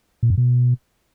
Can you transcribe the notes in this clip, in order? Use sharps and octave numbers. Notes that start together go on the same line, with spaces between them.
A#2
F#2
B2